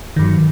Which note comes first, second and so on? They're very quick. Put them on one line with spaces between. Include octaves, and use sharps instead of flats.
D#3 G2 F#3